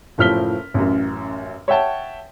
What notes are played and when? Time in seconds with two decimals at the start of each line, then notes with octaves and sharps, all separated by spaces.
0.18 F#1 A2 F3 F6 B6 G7
0.74 A1 F#2
1.68 C#5 E5 F#5 G5 A5